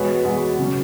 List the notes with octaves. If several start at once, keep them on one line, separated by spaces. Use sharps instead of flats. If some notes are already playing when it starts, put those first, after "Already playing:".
Already playing: E2 B2 G#3 B4 C#5
E2 B2 G#3
C#3 F#3